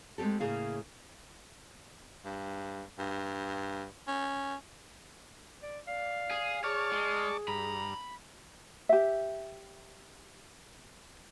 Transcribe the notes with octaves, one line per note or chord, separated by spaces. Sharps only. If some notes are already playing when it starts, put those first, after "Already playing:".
G#3 A3 C4 G4 A4
A2 C#3 A#3 G#4 F5
G2
G2
C#4
D5
D5 F5
G#4
G#4 C#5 D5 A5 C#6 F6
G#3
G2 A#5 B5
G4 E5